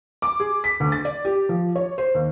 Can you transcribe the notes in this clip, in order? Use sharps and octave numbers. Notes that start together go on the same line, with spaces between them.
D6
G#4
B6
D2
A6
D5
G4
F3
C#5
C5
D#2